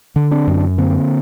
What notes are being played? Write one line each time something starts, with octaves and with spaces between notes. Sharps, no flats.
D3
C4 D4
F#2
D3 A#3 C4